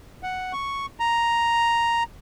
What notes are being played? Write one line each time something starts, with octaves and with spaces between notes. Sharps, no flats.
F#5
C#6
A#5